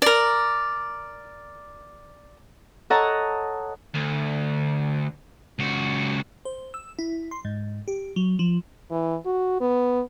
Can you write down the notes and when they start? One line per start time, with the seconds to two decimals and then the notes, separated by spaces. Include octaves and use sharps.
0.02 A#4 D5
2.90 A4 C#5 D#5 F#5 A5 A#5
3.94 D2
5.59 C#2 F#4
6.45 C5
6.74 E6
6.99 E4
7.31 C6
7.45 G#2
7.88 G4
8.16 F#3
8.39 F3
8.91 E3
9.26 F#4
9.61 B3